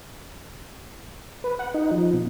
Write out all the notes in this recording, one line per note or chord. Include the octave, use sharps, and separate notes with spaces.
B4
F#5
D#4
F3
B2